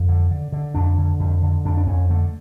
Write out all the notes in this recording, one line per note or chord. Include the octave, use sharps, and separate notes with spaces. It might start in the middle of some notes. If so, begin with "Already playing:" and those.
Already playing: F2 C#4
D3
D3
D3
F2 D4
D3
F2
D3
F2 D4
D4
F2 C#4
D3 A3